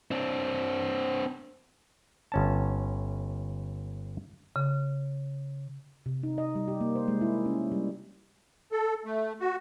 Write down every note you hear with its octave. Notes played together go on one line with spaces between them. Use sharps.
C4 D4
G1 C#4 A5
C#3
C3
D#4
D#5
G3
G4
A#3
C5
G#3
E4
C#4
G3
A4
A3
F#4